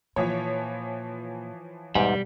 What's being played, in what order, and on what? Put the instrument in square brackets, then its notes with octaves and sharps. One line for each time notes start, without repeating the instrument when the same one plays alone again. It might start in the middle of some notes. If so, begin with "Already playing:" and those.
[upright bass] A#2 [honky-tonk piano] E3 F3 C#5
[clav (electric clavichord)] E2 G#2 [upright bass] B2 [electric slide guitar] G3